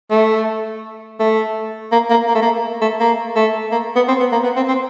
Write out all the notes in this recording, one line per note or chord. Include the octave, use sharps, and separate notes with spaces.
A3
A3
A#3
A#3
A#3
A3
A#3
A3
A#3
A3
A#3
B3
C4
B3
A#3
B3
C4
C4